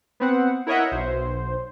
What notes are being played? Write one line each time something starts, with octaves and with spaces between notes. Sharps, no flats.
B3 C4 F#5
E4 A#4 C#5 D#5 E5 F#5
B1 C5